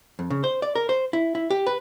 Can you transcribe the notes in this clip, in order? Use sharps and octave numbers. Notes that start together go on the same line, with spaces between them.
F2
C#3
C5
D5
A#4
C5
E4
E4
G4
B4